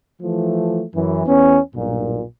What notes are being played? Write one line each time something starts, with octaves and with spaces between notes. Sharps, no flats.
E3 F3 A3
F#2 E3
E2 B3 C#4
B1 G2 A#2